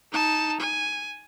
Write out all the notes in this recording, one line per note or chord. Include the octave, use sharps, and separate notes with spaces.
D#4 A5
G#5